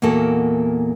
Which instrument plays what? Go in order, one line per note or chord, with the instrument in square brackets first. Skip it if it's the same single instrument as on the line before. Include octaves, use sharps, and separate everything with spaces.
[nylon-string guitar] E2 A#2 A#3 F#4 A4